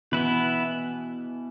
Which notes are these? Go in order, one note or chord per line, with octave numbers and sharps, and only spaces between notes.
B2 E3 B3 E4 B4